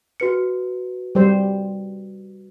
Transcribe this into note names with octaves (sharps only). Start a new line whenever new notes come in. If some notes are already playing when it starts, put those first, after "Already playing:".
F#4 B4 C#7
G3 C5